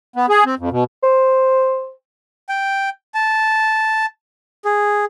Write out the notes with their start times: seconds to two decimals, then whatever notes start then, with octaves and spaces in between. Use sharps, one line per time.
0.16 B3
0.30 G#4
0.45 C4
0.59 F2
0.71 B2
1.03 C5
2.49 G5
3.14 A5
4.65 G#4